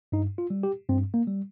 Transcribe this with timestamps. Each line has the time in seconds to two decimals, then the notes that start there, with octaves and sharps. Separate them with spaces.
0.12 G2 D#4
0.38 F4
0.50 G3
0.63 G4
0.89 G2 C4
1.14 A#3
1.27 G3